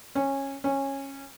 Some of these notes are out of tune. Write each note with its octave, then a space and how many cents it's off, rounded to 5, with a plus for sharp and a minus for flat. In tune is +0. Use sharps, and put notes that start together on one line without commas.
C#4 -15
C#4 -15